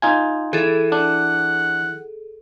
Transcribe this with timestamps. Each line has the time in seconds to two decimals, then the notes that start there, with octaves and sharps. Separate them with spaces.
0.02 D#4 F4 G#5
0.53 E3 G#4 A4
0.92 D4 F#5